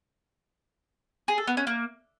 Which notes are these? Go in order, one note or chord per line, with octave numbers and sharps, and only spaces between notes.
G#4
A4
B3
C#4
A#3